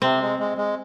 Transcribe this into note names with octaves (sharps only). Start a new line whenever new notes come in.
C3 C4
G#3
G#3
G#3